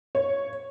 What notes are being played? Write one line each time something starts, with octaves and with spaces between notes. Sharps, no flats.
C#5